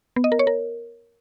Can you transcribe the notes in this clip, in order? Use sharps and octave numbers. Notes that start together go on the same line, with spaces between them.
B3
D#5
A#4
C#5
A#4